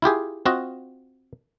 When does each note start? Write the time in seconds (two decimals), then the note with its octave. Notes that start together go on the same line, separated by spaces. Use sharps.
0.02 E4 F4 G4 G#4
0.46 C4 F4 F#4 D#5